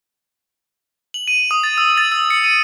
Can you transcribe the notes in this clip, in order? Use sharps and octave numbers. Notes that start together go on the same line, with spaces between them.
F#7
D#7
D#6
A6
E6
A6
E6
C#7
D#7